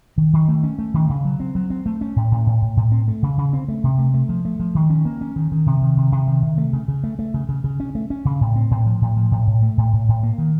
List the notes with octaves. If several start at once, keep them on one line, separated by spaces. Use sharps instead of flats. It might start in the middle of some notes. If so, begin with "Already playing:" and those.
D#3
D#3
A3
C#4
A3
D#3
C#3
F#3
C4
F#3
C4
A3
C#4
A2
A2
A2
A2
A2
C4
A3
C#3
C#3
C4
A3
C3
A3
A3
F3
A3
F3
D#3
C#4
A#3
C#4
D#3
D#3
C3
D#3
C3
C3
D#3
C3
A3
C#3
C#3
A3
A3
C#3
C#3
C#3
C#4
A3
C#4
C#3
A2
C4
A2
F3
A2
F3
A2
A2
A3
A2
A2
A2
A#3
D#3